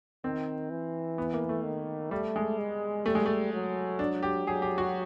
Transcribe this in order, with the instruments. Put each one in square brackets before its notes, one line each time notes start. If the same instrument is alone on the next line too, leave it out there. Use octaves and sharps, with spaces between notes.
[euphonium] D#3 [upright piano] C4
[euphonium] E3
[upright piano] B3
A#3
A3
[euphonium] D#3
[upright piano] G3 [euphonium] A3
[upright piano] G#3
[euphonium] G#3
[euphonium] G3 [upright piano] A3
[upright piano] G#3
A3
[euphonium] F#3
[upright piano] D4
G4
[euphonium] F#3 [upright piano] G#4
[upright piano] G4
F#4